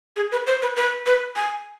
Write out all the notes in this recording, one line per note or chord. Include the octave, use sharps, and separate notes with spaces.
G#4
B4
C5
B4
B4
B4
G#5